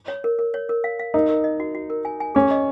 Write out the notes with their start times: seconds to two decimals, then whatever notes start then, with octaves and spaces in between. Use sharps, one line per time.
0.08 C#5
0.24 A#4
0.39 A#4
0.54 C#5
0.69 A#4
0.84 F5
0.99 F5
1.14 D#4 A#4
1.29 A#4
1.44 D#5
1.60 F#4
1.75 F#4
1.90 A#4
2.05 G#5
2.20 G#5
2.35 C#4 G#4
2.51 D#5